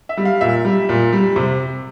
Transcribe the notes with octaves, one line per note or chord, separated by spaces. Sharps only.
E5
G3
F5
A#2 E5
G3
A#2
G3
C3